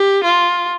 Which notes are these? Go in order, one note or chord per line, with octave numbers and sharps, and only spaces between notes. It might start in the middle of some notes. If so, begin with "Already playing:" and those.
Already playing: G4
F4